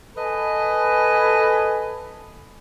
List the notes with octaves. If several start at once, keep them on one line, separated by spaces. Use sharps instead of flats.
A4 B4 D#5 G#5 A5 B5